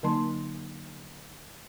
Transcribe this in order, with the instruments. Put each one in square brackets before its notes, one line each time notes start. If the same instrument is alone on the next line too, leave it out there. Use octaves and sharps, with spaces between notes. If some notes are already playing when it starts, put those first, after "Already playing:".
[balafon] D3 F#3 A#3 D#4 A5 C6